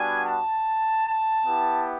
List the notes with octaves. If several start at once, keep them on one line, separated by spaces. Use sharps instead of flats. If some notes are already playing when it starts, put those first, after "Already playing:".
Already playing: G3 B3 D4 F#4 G#5
A5
A5
B3 E4 G4